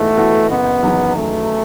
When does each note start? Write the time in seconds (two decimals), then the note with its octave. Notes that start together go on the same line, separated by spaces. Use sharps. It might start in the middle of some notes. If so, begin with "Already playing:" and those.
Already playing: G#2 E3 A3 B3 F#4
0.17 E3 B3 F#4 A4
0.51 F#1 B3
0.83 E2 D#3 F#3
1.16 F#1 A3